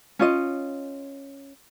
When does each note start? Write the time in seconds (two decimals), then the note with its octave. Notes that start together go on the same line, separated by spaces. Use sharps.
0.19 C#4 F4 D#5